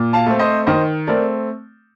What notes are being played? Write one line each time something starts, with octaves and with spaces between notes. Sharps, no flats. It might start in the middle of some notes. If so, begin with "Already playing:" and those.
Already playing: A#2
F5 A5
A3 C4
C5 D#5
D#3 C5 D#5
A3 C4 A#4 D5